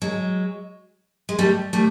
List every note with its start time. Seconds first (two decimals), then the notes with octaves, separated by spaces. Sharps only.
0.02 F#3 G#3
1.29 G#3
1.39 G3 A3
1.73 G3 A3